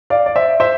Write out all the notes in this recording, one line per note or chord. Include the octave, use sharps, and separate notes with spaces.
D5 F5
D5
C5 E5
C5 E5